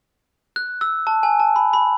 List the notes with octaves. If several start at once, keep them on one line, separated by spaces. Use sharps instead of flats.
F#6
E6
A5
G#5
A5
B5
B5